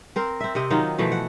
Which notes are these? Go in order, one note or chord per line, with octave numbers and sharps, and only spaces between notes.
C4 A#4 C5
C4 E5
C3 C4 D#5
D#3 F#3 D#4 F4
B2 E3 F3 A3
F#5